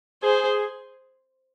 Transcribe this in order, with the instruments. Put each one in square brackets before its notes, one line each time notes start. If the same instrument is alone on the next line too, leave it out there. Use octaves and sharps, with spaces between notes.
[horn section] G#4 [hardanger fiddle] C5